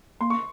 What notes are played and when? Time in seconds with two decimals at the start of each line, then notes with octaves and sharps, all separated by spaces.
0.21 A#3 C6
0.30 C#6